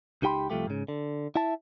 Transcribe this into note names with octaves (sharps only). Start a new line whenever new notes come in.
C#2 D#4 G4 G5 B5 C6
C2 F3 A3 G4
G#2 C#3
D3
E4 E5 A5